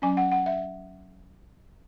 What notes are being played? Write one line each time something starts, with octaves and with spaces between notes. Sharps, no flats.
F#3 C#4 G#5
F#5
F#5
E5